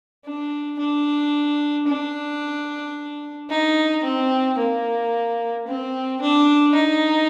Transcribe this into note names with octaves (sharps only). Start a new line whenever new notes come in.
D4
D4
D4
D#4
C4
A#3
C4
D4
D#4